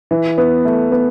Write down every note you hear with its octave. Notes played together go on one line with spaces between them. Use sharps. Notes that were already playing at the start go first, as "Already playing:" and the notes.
E3
B3
A3
B3